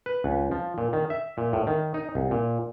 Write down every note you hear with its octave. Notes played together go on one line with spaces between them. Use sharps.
B4
C#2
F3
A#2
D#3
E5
A#2
A2
D#3
D#4
C2
A#2